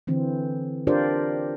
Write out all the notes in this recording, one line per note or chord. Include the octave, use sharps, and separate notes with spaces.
D3 E3 C4
D4 F4 G4 A#4 C5 D5